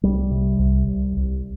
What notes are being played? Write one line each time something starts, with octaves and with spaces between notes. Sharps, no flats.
C2 G3
C3
C2
C2
C2